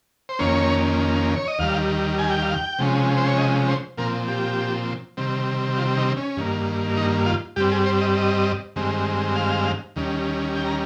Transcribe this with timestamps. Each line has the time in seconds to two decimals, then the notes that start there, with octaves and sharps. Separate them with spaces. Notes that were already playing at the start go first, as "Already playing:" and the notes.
0.29 C5
0.39 F2 D#3 A#3 C#4 C#5
1.36 C#5
1.48 D#5
1.59 D#2 D#3 G3 F5
2.19 G#5
2.31 G5
2.42 F5
2.55 G5
2.79 C3 F3 G#3 C#4
3.17 C5
3.27 C#5
3.38 D#5
3.68 C5
3.97 A#2 F3 C4 A#4
4.28 G4
5.17 C3 D#3 G3 C4
5.77 F4
5.98 D#4
6.17 C#4
6.37 G2 D#3 A#3
6.97 D#4
7.26 F4
7.56 G2 G3 C4 G4
7.72 G#4
7.86 C5
8.01 D#5
8.17 D#5
8.76 G2 D#3 G#3 C4
9.36 F5
9.96 D#2 D#3 G3 C#4
10.56 G5
10.66 A#5